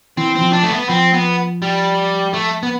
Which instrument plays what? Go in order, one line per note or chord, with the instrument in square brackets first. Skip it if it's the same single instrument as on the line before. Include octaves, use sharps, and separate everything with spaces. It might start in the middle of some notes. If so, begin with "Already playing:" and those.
[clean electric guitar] E3 [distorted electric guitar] C4
[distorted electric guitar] C4
[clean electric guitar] F3
[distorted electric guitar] D4
A3
B3
[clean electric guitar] F3 [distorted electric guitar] C4
[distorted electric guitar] B3
G3
A3
B3